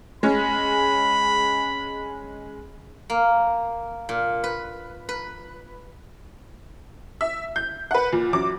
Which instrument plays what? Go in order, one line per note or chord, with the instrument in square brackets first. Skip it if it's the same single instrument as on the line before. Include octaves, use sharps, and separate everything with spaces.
[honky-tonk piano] G#3 C#4 [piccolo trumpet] B5
[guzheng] A#3
A#2
B4
B4
[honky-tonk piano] E5
G6
B4 F#5
A#2
F#2 D6